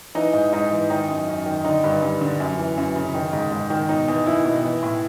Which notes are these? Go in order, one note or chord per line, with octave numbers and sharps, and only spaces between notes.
E3 D#4
G#2
G#2 D#4
E3
D#3 D#4
F#2
F#2
D#3
D3 D#4
G2
G2
D3
F#2
E3
F#2
C#3
D#3
G#2
G#2
D#3
B2 D#4
E2
E2 E4
B2
E3
A2